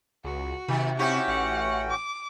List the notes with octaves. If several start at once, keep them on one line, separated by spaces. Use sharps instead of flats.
C#2 F#4
C3 D#3
C#4 D#4 E4 F#4 G4 G5 C#6
A1 F#5
D6